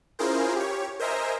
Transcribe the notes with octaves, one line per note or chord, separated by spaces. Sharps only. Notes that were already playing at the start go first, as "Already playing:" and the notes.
C#4 E4 F4 G#4 A#4 C5
G4 C#5
A#4 C5 D#5 E5 G#5 A#5